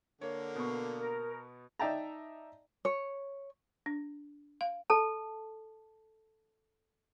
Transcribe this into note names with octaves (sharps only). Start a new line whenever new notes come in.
D3 A#3 C#5
B2 B3 C#6
A#4
D#4 D5 E5 G5 A5 A#5
C#5
D4
F5
A4 A5